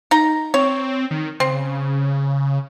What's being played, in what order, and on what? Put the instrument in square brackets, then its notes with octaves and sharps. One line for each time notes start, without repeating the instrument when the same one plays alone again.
[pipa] D#4 A#5
[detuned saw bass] C4 [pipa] C#5
[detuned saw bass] D#3
[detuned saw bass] C#3 [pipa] C4